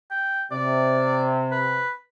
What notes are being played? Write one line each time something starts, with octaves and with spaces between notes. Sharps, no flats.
G5
C3 D5
B4